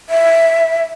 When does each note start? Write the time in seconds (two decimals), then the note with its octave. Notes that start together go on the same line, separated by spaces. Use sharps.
0.09 E5